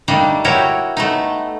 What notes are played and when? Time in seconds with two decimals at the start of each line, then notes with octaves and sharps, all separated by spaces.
0.08 G3 A3 A#3 D4 D#4
0.45 E4 F#4 A#4 C#5 G5
0.97 A3 B3 D#4